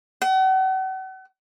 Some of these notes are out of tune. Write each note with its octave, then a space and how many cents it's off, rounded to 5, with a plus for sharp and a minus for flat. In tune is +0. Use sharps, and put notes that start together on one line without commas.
F#5 +40